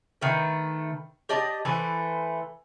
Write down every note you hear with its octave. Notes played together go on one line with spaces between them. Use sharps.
D#3 A3 B4
G4 D5 D#5 A5
E3 A3 B4 C5